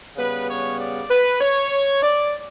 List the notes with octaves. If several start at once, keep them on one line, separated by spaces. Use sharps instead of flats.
C#3 G3 B3 B4
C#5
D5
B4
C#5
D5